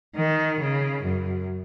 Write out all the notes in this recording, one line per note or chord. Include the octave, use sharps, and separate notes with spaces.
D#3
C#3
F#2